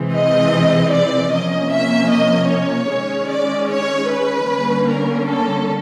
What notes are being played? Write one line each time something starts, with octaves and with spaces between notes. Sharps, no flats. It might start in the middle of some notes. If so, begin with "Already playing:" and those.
Already playing: C3 E3 G#3 C4
D#5
D5
C3 F3 A#3 C#4 D#5
E5
D#5
C#5
D#3 G#3 C#4
D5
C#5
B4
D3 G3 A#3 C#4
A#4
A4